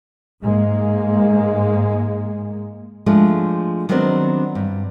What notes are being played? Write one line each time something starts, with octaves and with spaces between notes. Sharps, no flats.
G#2 G#3 A#3
F3 G#3 A3 D4
D#3 F#3 G3 B3 C4 D4
G2